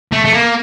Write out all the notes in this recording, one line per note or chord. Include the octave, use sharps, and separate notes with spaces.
A3
A3
A#3